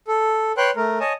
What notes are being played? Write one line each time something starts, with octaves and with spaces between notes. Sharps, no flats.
A4
B4 C#5 G5 C6 F#6
A3 A#4
C#5 D#5 G#5 A5